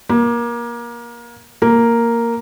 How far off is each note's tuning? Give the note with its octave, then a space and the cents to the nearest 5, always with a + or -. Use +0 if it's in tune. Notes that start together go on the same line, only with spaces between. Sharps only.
A#3 +25
A#3 -5